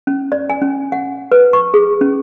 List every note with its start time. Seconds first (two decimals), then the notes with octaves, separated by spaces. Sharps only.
0.07 C#4
0.32 D5
0.50 G#5
0.62 C#4
0.92 F#5
1.32 B4
1.53 C#6
1.74 G#4
2.01 C#4